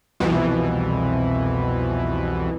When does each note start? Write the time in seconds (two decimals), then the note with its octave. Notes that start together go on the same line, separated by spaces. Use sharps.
0.20 C2 F2 B2 E3